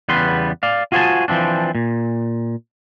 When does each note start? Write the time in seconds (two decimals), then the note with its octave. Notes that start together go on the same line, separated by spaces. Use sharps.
0.09 E2 C#3 G3 B3 B4 C6
0.63 D5 F5
0.92 F4 F#4 G#4 C5 G#5 A5
1.28 E3 F3 C4 D4
1.75 A#2